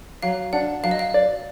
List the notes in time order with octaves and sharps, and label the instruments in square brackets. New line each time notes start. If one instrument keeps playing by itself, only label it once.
[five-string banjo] F#3 [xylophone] F5
[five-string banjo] D4 [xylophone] F#5
[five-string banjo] F#3 [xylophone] F5
[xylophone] D#5
F5
[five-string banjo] D5